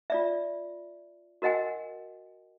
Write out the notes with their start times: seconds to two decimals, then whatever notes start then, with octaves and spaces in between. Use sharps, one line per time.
0.10 F4 D5 E5
1.42 F#4 A#4 D#5 F#5 G#5